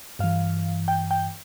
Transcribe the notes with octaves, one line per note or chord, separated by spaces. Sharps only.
G2 E3 F5
G5
G5